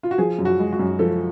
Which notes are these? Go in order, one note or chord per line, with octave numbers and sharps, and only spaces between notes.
F4
F#4
F3 G#4
F#2
F#4
G#3
F#4
F#2
F3 A4